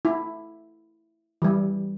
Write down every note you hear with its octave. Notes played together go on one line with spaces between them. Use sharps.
E4
E3 G3